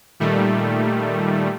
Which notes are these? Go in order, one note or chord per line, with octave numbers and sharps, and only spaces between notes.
A#2 D#3 G3 A3